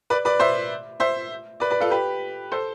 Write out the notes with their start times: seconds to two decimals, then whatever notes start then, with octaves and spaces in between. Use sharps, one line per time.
0.10 B4 D5
0.25 B4 D5
0.40 C5 E5
1.00 C5 E5
1.60 B4 D5
1.70 B4 D5
1.80 F4 A4
1.90 G4 B4
2.52 A4 C5